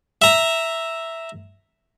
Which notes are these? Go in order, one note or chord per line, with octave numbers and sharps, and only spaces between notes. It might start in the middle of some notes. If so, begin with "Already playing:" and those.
E5 A#5